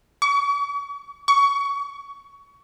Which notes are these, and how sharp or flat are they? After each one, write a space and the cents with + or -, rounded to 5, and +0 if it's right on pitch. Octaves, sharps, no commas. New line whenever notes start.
C#6 +45
C#6 +25